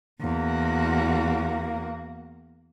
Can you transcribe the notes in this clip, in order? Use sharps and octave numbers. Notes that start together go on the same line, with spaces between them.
E2 A#3 F#4